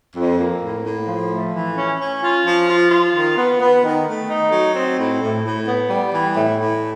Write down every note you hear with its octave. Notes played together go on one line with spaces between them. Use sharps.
F2
A#3
A2
A2
F3
A3
E3
C#4
C#4
F4
F3
F4
F4
D#3
B3
B3
D#3
A3
D#4
F#3
C4
A2
A2
A2
B3
G3
E3
A2
A2